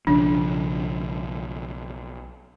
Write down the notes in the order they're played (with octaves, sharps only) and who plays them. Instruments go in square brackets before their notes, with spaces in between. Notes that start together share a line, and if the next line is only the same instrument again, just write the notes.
[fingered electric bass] B1 C#3 F3 [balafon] D4